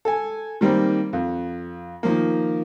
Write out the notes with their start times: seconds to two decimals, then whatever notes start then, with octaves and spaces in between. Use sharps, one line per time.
0.05 A4 G#5
0.61 D#3 G3 A#3 C4
1.13 F2
2.03 D#3 F3 A#3